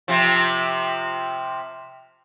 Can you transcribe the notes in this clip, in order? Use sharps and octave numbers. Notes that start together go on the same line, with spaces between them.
C3 F3